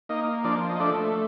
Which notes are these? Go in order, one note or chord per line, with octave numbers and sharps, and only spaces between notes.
A#3 D#4 D#5
F3 D4 D5
D#5
A3 D4 D5